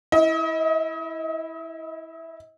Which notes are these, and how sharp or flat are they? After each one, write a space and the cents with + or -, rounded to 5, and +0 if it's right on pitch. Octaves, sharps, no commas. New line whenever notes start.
E4 -10 D#5 +35